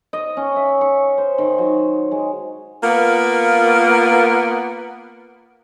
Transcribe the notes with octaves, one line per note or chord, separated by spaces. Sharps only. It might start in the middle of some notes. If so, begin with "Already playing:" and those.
D#5
C#4
E5
C#6
C5
D#3
F#3
G#3
A#3 B3 F4 A#4